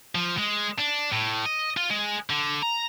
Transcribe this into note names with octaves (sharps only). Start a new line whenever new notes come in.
F3
G#3
D4
A2
D#5
F4
G#3
D3
A#5